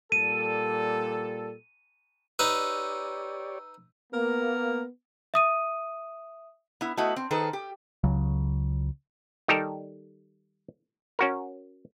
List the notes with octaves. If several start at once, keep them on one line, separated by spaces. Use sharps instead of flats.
A#2 G3 A4 D#7
D#4 G4 B4 C#5 D5 E6
A#3 B3 A#4
E5 D#6 D#7
B3 E4
A3 B3 E4 F#4 D#5
C4
D#3 G#4 A4 B4 C5
G4
C#2 C#3 F#3
D#3 G3 D#4 G4 A4 A#4
C#4 F#4 A#4